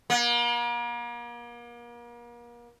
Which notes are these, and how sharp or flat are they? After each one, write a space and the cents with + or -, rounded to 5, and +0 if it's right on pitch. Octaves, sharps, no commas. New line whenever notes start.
A#3 +40